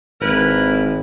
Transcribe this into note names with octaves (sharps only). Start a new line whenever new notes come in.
G#1 E4 A#4 B4